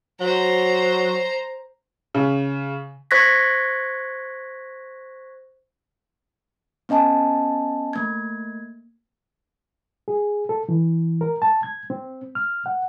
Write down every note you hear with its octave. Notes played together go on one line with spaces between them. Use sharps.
F#3 C5 A#5
C#3
C5 C#6 F#6 G#6 A#6 B6
B3 C#4 D#5 G#5 A5
A3 A#3 G#6
G#4
A4
E3
A#4
A5
G#6
C4
F6
F#5